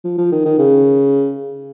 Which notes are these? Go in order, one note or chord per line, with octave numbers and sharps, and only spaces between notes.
F3
F3
D#3
D#3
C#3